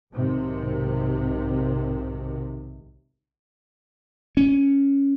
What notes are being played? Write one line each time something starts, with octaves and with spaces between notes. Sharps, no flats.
B1 G#2 C3 D#3
C#4